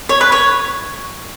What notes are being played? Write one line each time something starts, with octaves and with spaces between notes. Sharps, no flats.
C#5
B4
C#5